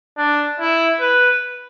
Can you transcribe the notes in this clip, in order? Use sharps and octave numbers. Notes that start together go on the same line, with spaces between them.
D4
E4
B4